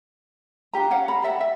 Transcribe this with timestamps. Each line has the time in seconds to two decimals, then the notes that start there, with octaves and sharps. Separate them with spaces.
0.73 D4 F4 G4 A#5
0.90 C#4 C#5 F5 F#5
1.08 A#5 B5
1.22 G4 D5 E5 F#5
1.41 E5